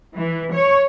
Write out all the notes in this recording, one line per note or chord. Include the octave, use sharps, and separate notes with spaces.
E3
C#5